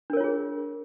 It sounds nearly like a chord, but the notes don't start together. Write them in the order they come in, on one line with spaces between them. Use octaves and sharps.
D4 A#4 C#5 F4 G#4